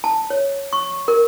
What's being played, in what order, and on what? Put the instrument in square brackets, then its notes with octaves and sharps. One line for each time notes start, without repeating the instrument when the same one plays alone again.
[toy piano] A5
C#5
C#6
A#4